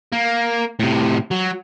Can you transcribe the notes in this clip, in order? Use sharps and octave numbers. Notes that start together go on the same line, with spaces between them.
A#3
A2 C3
F#3